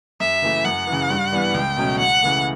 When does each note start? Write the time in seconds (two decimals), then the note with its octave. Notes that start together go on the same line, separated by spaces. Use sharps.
0.20 F#2 E5
0.42 C#3 E3 A3 E4
0.65 F#2 F#5
0.87 E3
0.92 C#3
1.10 G2
1.32 E3 G3 B3
1.54 C#2 G5
1.77 B2 F#3 A3 C#4
1.99 C#2 F#5
2.23 C#3 E3 A3